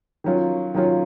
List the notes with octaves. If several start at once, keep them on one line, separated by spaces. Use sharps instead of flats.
D#3 F#3 C#4 F4
D#3 F#3 C#4 F4